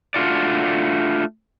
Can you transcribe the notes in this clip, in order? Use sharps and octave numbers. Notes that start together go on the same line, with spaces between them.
A3 D4 F4 F#4 D5